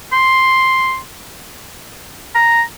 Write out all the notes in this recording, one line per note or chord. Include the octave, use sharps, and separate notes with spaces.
C6
A#5